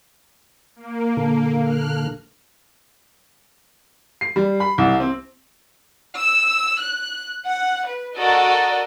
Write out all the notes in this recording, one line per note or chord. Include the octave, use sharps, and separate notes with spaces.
A#3
A#2 D3 A4
F6 F#6
C7
G3
B5
C2
C4
E6
F#6
F#5
B4
F#4 A4 A#4 D5 D#5